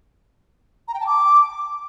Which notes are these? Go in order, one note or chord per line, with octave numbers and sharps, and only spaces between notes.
A#5
G5
A5
D6